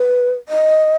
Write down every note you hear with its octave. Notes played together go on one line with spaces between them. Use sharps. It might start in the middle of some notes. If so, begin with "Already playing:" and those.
Already playing: B4
D#5